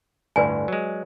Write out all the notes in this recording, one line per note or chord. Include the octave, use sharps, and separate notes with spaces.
G1 D2 A2 B4 D5 G#5
F#3 G#3